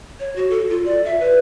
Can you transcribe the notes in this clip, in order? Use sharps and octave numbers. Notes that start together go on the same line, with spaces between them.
C#5
F#4
A4
F4
D5
E5
B4